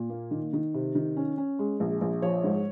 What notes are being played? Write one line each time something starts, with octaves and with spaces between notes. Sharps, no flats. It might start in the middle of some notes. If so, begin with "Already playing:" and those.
Already playing: A#2
A#3
D#3
D#3
C3
D#3
C#4
C#4
G#3
A#1
A#1
F3 C#5
G#2